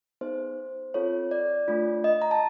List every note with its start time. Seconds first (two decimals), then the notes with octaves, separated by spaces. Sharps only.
0.21 B3 D#4 G#4 C5
0.94 C4 F4 A4 C#5
1.31 D5
1.68 A3 D4 F4
2.04 D#5
2.22 A#5
2.31 A5